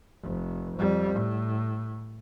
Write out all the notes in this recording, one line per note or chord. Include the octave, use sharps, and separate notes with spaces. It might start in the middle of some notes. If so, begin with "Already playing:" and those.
F1
F2 G3
A2